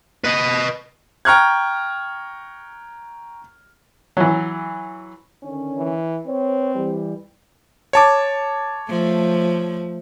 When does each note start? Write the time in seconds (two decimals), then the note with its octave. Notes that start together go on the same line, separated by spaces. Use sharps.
0.25 B4 D#5
1.25 G5 A#5 C#6 F6 F#6 G#6
4.17 E3 F#3
5.43 D3 D#3 C#4
5.78 E3
6.27 C4 B4 C#5
6.74 E3 G3
7.93 C#5 A5 D6
8.89 F3 A3